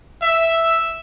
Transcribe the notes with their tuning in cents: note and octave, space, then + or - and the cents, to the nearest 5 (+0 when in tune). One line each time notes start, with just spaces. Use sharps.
E5 +0